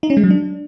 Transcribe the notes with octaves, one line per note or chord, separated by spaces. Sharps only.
D#4
C#4
G#3
F#3
D4